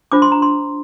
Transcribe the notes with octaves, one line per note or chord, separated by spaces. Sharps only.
D4 F4 C5 D6
C6
A#5
C6